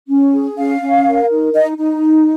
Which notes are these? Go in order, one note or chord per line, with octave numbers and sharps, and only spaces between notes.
C#4
G#4
C#4 F5
C#4
A#4
D#4
D#4 D#5
D#4